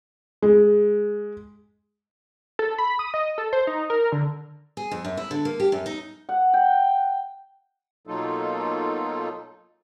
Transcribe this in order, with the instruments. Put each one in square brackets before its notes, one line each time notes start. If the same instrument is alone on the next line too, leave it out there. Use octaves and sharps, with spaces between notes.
[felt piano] G#3
[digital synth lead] A4
B5
D#6
D#5
A4
C5
D#4
A#4
D3
[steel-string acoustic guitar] G#4
F2
F#2
E4
D3
A#3
G4
F#2
D#4
[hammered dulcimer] F#5
G5
[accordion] B2 F#3 A#3 D#4 F4 A4